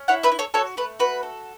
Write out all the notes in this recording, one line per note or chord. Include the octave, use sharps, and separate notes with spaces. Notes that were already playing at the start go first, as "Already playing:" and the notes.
Already playing: C#4
E4 C#5 F#5
B4 E5
E4
A4 C#5
F#4 A4 C#5
A3 B4
F#4 B4
A4